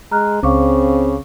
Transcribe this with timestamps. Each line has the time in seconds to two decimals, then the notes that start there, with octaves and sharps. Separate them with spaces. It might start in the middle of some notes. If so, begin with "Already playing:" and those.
0.12 G#3 A#5 F6 F#6
0.43 C#2 C#3 C4 F5 C#6 D6